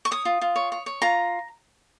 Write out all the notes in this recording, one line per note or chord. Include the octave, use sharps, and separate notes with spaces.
C#6
C#5 D#6
F4
F4
C#5
C#5
C#5
F4 A#5